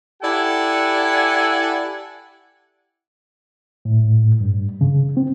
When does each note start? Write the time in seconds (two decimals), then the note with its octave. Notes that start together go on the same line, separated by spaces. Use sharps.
0.22 E4 G4 A4 D5 F#5 G#5
3.85 A2
4.41 G2
4.81 C#3
5.17 C4